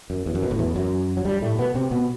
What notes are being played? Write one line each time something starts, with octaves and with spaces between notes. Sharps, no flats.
F#2
E2
F#2
B1 B2
A1 A2
E2 E3
F#2 F#3
F#3
G2 G3
A2 A3
B2 B3
C3 C4
B2 B3